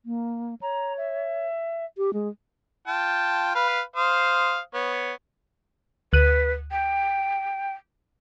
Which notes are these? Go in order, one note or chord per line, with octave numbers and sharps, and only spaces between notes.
A#3
C#5 A#5
E5
G4
G#3
F4 G5 A5
B4 F5
C5 F5 D#6
B3 C#5
D2 B4 F#6 D#7
G5